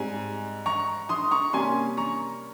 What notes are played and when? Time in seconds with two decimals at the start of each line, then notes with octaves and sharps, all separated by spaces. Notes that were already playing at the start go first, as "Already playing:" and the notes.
Already playing: G#2 G3 C4 G#5
0.66 A#5 C#6
1.09 C6 D#6
1.31 A#5 C#6
1.53 C3 G3 A#3 C#4 G#5 C6
1.97 A#5 C#6